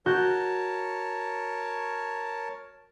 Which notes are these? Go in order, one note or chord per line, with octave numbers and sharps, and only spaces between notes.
F#4 A#4 C#5 A5 G6